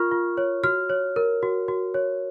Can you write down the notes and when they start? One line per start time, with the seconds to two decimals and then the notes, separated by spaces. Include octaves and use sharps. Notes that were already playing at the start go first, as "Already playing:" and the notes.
Already playing: F4 A#4 C#6 F6
0.11 F4
0.37 C#5
0.64 F#4 F6
0.89 C#5
1.16 A#4
1.43 F#4
1.68 F#4
1.94 C#5